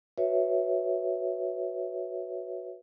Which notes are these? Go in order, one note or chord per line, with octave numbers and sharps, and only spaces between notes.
F#4 B4 C#5 E5